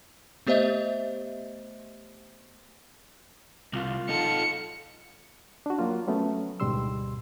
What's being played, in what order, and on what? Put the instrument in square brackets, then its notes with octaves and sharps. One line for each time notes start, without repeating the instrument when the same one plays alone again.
[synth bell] A3 B3 G4 C5 D#5 E5
[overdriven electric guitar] C2 [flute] F4
[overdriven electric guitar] D#4 A4 [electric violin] C#7
[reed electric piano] D4 F#4
F#3 A#3 F4
F#3 A3 B3 C#4
D2 G#2 B2 G3 C6 E6